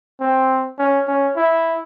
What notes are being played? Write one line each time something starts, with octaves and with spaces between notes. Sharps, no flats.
C4
C#4
C#4
E4